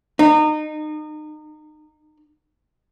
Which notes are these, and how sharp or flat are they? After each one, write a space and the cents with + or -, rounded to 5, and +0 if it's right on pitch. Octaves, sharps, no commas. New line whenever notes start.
D#4 -30